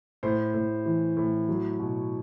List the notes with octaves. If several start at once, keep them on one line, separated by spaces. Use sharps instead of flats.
A2 C5
A2
E3
A2
F#3
B2